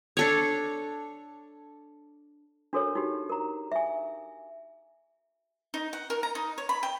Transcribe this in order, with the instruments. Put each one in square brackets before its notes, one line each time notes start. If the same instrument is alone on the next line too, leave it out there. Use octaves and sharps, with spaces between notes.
[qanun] D4 A4 C#5
[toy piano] D4 F#4 A4 A#4 C#5
D#4 F#4 G4
A#4 A#5
E5 G#5
[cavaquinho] D#4
F#5
A#4
A#5
D#4
C#5
B5
G5